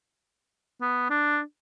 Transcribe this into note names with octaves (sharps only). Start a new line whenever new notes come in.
B3
D4